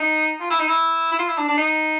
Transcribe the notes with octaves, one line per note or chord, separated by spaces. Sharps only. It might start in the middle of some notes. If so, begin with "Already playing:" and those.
Already playing: D#4
F4
E4
D#4
E4
E4
F4
E4
D4
D4
D#4